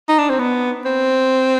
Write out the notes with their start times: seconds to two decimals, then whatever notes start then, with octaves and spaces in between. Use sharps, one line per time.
0.09 D#4
0.19 D4
0.29 C4
0.39 B3
0.85 C4